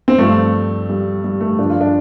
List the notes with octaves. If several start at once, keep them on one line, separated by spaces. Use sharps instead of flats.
C4
G2 F3 A3
G3
G3
A3
G2 F3 D4
F4
D4